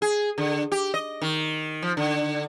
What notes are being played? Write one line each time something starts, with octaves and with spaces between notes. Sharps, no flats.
G#4
D3
G4
D#5
D#3
F3
D3